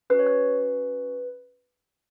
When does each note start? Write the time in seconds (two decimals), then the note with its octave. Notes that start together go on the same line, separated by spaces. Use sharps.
0.10 C#4 B4
0.14 F#4
0.19 C#5
0.27 B4